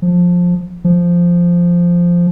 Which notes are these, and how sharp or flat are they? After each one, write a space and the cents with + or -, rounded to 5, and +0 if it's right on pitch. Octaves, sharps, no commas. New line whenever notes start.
F3 +15
F3 -5